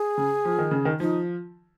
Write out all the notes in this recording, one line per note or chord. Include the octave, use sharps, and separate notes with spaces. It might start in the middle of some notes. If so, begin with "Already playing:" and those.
Already playing: G#4
C#3
F3
D#3
C#3
D#3
F3 D#4